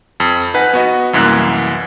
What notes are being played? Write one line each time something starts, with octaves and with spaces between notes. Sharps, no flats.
F2
D#4 B4 F#5 G#5
B3 F#4 D#5
C2 F#2 E3 A#3 F#6